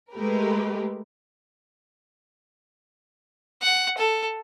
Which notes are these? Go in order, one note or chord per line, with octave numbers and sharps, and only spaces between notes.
G#3 A3 G4 A#4 B4
F#5
A4